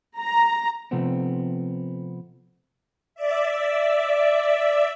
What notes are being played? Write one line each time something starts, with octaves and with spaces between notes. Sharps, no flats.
A#5
C3 F3 A3 B3 C4
D5 E5